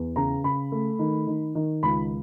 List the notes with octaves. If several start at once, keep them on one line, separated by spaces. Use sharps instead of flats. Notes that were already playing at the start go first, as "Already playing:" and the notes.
Already playing: E2
C#3 A#5
C#3 B5
A3
D#3
D#3
D#3
C#2 B5